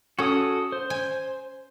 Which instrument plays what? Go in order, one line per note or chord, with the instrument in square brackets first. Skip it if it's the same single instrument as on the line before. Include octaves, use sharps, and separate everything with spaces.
[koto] C#4 [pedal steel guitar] F#4 A4 D#6
[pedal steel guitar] C5
[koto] G#5